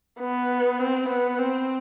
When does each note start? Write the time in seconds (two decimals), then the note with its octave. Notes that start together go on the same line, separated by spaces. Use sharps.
0.20 B3
0.79 C4
1.09 B3
1.39 C4